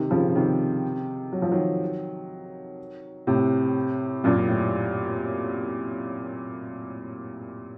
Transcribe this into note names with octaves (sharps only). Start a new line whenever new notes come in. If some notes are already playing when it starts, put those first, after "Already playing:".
Already playing: C3 D#3
C#3 F3
C#3
C3 D#3
F#3
F3
D#3 F#3
A2 C3
F#2 A#2
A2